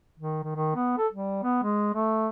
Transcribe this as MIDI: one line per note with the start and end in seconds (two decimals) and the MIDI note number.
0.19 0.40 51
0.43 0.52 51
0.56 0.74 51
0.75 0.97 59
0.98 1.07 69
1.13 1.39 55
1.43 1.59 59
1.63 1.92 56
1.94 2.29 57